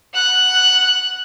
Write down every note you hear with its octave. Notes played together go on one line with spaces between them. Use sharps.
F#5 F#6